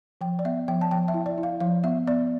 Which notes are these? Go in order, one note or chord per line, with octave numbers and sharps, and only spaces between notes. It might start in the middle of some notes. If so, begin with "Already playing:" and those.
F3 G5
D5
B3 E5
F3 G5
A5
F3 G5
E5
E4
D5
E4
F5
F3 F5
B3 E5
B3 D5